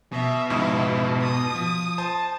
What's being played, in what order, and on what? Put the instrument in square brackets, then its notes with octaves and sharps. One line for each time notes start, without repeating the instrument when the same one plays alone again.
[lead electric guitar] B2 [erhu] E5
[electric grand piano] F2 G#2 C#3 [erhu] E4
[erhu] D#6
[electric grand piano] F3
[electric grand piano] C5 [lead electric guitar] A5